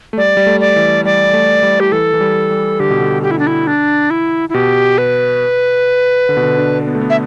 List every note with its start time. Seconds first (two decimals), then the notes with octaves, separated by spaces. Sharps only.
0.13 A3
0.17 G3 D5
0.37 G3
0.47 A3
0.60 D5
0.76 E3
1.05 G3 D5
1.33 A3
1.63 G3
1.80 G4
1.92 E3 A4
2.14 E3
2.21 G3
2.51 G3
2.80 D3 G4
2.90 B2
3.00 D3
3.23 G4
3.31 E4
3.39 D4
3.47 E4
3.67 D4
4.10 E4
4.49 E4
4.54 B2 G4
4.98 B4
6.29 D3
6.37 B2
6.43 D3
6.58 D4
6.87 B3
6.95 A3
7.01 B3
7.10 E5